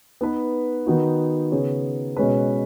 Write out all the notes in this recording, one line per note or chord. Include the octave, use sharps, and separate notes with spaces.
B3 D#4 B4
D#3 B3 D#4 F#4
C#3 B3 G#4 C#5
B2 G#3 C#4 B4